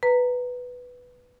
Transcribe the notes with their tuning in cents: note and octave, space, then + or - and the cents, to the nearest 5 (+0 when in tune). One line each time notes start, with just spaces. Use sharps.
B4 +0 A#5 -15